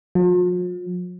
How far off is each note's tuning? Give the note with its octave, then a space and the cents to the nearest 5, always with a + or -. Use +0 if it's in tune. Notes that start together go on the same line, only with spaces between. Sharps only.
F3 +45